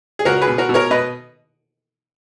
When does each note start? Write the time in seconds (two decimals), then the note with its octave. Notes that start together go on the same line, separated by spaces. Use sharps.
0.19 G#4
0.25 C#2 F#4 A#4
0.42 G#4 B4
0.47 B2
0.58 F#4 A#4
0.69 B2
0.74 A#4 C#5
0.91 B2 B4 D#5